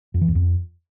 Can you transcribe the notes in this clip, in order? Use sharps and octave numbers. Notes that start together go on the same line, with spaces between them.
F2
E3
E2
F2